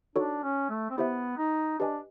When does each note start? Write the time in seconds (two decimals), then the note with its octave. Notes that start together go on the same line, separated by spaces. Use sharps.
0.16 D4 D#4 F#4 A4 C#5
0.43 C#4
0.70 A3
0.90 C4
0.98 B3 E4 G4 C5 E5
1.38 D#4
1.79 D4 G4 B4 D#5 G#5